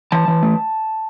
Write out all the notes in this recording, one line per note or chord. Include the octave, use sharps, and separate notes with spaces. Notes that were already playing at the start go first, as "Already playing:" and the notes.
E3 A5
E3
A3